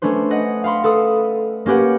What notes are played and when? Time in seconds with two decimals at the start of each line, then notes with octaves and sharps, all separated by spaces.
0.02 A3 C#4 D4 B4 C5
0.31 D#5 F#5
0.64 F5 F#5 B5 C6
0.84 A4 B4 B5 D#6
1.66 A#3 C#4 G4 B4 F#5